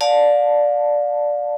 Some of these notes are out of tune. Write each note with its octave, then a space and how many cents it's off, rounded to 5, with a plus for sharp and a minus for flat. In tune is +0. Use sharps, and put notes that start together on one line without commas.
D5 +0 F5 +30 A5 +0